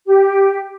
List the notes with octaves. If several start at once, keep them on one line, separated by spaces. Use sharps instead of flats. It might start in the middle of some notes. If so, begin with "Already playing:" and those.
G4